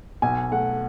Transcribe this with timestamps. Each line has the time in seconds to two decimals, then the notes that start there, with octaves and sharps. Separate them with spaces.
0.22 B1 G#5
0.52 A3 F#5